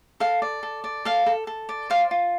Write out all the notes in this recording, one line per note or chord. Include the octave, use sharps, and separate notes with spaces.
A4 F5
D5
A4
D5
A4 F5
A4
A4
D5
C5 F5
F4